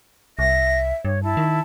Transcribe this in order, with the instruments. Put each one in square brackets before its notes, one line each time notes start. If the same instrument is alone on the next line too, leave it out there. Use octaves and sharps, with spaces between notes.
[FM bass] C2 [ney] E5 [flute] A#6
[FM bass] G2 [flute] C#5
[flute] E4 [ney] A5
[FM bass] D#3